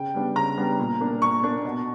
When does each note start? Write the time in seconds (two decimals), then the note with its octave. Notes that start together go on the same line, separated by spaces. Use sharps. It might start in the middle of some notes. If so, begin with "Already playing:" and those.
Already playing: C#3 G5
0.14 G3 B3 D4
0.36 C#3 A#5
0.57 G3 B3 D4
0.79 A#2
1.00 A#3 D4
1.22 A#2 C#6
1.43 A#3 D4
1.65 B2